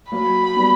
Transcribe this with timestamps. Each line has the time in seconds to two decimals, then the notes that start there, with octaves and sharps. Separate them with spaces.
0.12 F#3 A#3 B5
0.56 G3 B3